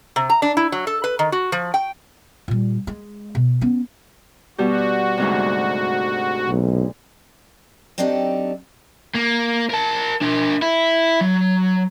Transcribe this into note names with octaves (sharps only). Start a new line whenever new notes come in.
C3
A#5
D4
E4
F#3
A4
B4
D#3
F#4
F3
G5
A#2 G3
G#3
B2
B3 C#4
B2 G3 F#4 G4
D2 G#2 C3
B1
F#3 C4 D4 D#4 G4 A4
A#3
A#4 A5
D4 A#4
E4
F#3